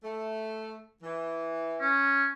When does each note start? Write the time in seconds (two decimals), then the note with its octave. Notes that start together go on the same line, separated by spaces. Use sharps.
0.04 A3
1.02 E3
1.81 C#4